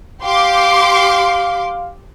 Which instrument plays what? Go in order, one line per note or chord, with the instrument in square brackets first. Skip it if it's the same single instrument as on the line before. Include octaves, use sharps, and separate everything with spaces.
[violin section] G4 C6 D6 [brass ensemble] F5